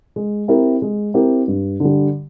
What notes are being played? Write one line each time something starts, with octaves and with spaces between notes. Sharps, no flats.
G#3
C4 E4 G4 A#4
G#3
C4 E4 G4 A#4
G2
D3
G3